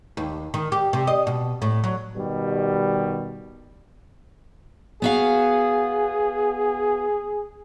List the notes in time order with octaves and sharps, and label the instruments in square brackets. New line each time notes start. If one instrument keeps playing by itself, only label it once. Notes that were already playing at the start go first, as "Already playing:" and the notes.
[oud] D#2
D#3
G4
C3
D#5
B2
A2
F#3
[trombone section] B2 D#3 G3
[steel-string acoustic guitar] B3 F#4 F5 [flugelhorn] G#4